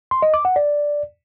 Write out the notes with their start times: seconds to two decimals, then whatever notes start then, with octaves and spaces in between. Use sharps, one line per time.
0.11 C6
0.22 D#5
0.34 D6
0.45 F#5
0.56 D5